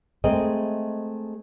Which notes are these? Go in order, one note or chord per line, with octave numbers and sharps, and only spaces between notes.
G#3 A3 C4 G#4 A#4 D#5